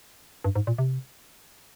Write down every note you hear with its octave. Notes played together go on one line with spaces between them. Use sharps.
G2
G#2
A#2
C3